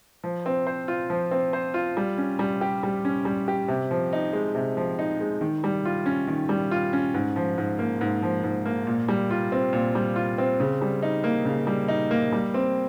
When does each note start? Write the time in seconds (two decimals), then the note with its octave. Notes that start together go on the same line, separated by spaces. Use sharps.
0.24 F3
0.46 C4
0.67 C5
0.88 F4
1.10 F3
1.31 C4
1.53 C5
1.74 F4
1.97 G3
2.18 C#4
2.39 G3
2.61 G4
2.83 G3
3.05 C#4
3.25 G3
3.48 G4
3.68 C3
3.91 F3
4.13 D#4
4.33 G#3
4.55 C3
4.77 F3
4.99 D#4
5.21 G#3
5.41 D#3
5.64 G3
5.85 F4
6.06 C#4
6.27 D#3
6.49 G3
6.71 F4
6.93 C#4
7.14 G#2
7.36 F3
7.58 G#2
7.79 A#3
8.01 G#2
8.22 F3
8.44 G#2
8.66 A#3
8.87 A#2
9.08 G3
9.30 F4
9.52 C4
9.73 A#2
9.95 G3
10.16 F4
10.38 C4
10.60 C#3
10.82 G3
11.03 D#4
11.24 A#3
11.45 C#3
11.67 G3
11.88 D#4
12.11 A#3
12.32 G3
12.54 C4